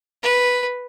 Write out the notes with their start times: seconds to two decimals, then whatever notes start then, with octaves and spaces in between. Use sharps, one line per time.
0.23 B4